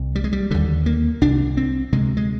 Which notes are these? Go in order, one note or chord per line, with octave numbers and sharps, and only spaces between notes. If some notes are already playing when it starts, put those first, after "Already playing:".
Already playing: C2 C3
G3
G#3
G3
D#2 D3 G3
A#3
C2 C3 D4
C4
D2 C3 G#3
G#3